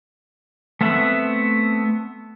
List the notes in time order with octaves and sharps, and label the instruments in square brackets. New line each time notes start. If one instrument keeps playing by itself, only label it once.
[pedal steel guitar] A3 B3 C4 E5 F#5